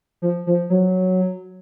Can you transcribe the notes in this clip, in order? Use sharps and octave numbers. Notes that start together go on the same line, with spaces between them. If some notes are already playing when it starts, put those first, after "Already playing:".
F3
F3
F#3